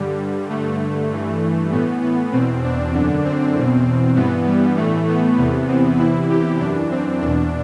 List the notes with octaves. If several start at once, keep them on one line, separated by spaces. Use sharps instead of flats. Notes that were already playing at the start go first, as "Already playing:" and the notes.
Already playing: G2 D3 G3
G2 D3 A3
G2 E3
A2 E3 B3
B3
E2 B2 C4
D4
F#2 D3
C4
E2 B2
G2 E3 B3
G3
A2 E3 A3
B3
E2 C3 E3
C4
E2 C3 E3 E4
G4
F#2 E3 D4
C4
E2 B2 D4